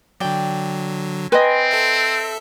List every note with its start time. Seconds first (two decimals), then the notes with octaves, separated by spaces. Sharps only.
0.20 D3 F#3 D5 G5
1.32 C4 B4 C5 D#5 G5 G#5
1.71 A4 E5